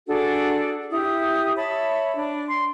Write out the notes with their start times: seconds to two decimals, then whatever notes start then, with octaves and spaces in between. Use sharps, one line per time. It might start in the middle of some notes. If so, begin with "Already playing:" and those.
0.07 D4 F#4 G#4 A4
0.92 E4 G4 D#6
1.56 C#5 E5 A5 B5
2.15 D4
2.48 C6